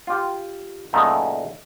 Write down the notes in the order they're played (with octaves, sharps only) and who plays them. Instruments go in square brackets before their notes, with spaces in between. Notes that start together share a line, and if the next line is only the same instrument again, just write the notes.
[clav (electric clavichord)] F4 G4
F#2 A#2 C#3 A3 B3 D#4